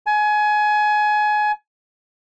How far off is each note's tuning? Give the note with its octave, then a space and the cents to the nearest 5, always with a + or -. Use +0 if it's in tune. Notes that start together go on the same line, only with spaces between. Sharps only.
G#5 +25